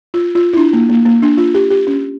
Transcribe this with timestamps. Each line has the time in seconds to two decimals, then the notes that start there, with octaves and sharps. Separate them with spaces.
0.14 F4
0.35 F4
0.53 E4
0.57 D4
0.73 A#3
0.89 A#3
1.05 A#3
1.22 D4
1.37 F4
1.54 G4
1.70 G4
1.87 C#4